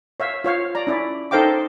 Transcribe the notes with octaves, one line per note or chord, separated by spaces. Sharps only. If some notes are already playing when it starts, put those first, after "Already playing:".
C#5 E5 F5
F4 C#5 F5
D5 A#5
C#4 E4 D5
D#4 A4 C5 F5 G5 D6